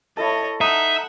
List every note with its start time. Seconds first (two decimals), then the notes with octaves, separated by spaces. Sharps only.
0.17 E4 A4 C#5 D#5 A5
0.61 D#4 E5 F#5